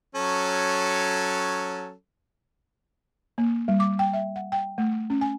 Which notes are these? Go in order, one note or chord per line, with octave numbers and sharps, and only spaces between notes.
F#3 C#4 A4
A#3
G3
D6
G5
E5
F#5
G5
A3
C#4
G#5